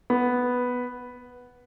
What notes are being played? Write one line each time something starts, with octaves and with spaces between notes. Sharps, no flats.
B3